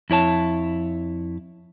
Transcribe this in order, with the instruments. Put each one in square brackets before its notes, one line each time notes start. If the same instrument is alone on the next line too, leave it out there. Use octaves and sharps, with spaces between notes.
[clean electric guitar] F2 E4 C#5 A5